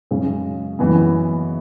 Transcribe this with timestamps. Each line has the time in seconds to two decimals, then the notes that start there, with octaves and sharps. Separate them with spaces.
0.11 F#2 C#3 G#3
0.79 F#1 F#2 E3 B3